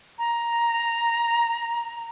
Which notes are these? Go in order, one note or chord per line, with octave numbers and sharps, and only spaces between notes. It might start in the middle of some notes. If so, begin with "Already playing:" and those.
A#5